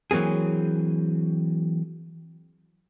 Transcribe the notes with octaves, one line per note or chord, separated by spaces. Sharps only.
E3 F#3 A#3 C4 G#4